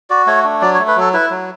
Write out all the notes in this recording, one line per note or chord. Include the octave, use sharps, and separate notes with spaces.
F#4 D5
A3 C#5
D4
F#3 D5
C#5
A3
B4
F#3 A4
E4 B4
F#3